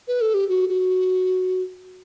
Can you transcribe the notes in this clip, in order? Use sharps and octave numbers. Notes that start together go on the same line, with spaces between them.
B4
A4
G4
F#4
F#4